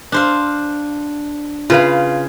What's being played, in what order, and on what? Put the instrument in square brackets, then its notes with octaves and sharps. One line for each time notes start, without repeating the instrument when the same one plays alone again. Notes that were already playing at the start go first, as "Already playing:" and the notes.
[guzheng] D4 C5 F5
[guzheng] C#3 [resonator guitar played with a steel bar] F4 B4 F5